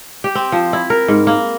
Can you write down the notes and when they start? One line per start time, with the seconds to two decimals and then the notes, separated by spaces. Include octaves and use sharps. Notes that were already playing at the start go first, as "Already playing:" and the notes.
0.24 G4
0.35 C4
0.52 F3
0.73 E4
0.90 A#4
1.08 G#2
1.27 A#3